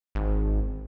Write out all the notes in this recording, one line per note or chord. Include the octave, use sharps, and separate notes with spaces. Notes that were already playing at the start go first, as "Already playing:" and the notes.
G#1